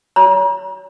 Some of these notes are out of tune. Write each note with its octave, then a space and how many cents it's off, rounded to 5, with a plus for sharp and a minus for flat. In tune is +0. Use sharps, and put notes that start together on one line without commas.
C#5 +30 A#5 +40